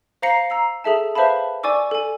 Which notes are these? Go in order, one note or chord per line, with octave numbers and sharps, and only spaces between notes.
C5 F5 A#5 A#6 C7 C#7
A#5 E6 C7
G#4 A4 E5 A5
B4 C5 E5 F5 A5 B5
D5 G#5 C#6 D6 E6
A4 G#5